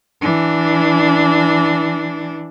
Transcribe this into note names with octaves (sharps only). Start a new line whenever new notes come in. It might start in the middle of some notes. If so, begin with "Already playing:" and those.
E3 D4